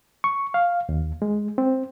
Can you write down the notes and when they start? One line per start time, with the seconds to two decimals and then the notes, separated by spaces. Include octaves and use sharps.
0.24 C#6
0.54 F5
0.89 D#2
1.22 G#3
1.58 C4